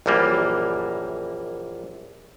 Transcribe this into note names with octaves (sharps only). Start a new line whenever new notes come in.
A#1 F#2 E3 G3 A#3